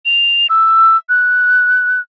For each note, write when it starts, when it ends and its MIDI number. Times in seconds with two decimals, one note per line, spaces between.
0.05 0.47 101
0.50 0.97 88
1.09 2.00 90